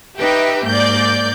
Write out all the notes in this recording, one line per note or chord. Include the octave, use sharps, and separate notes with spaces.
D#4 G4 B4 E5 G5
G#2 A#3 D5 G6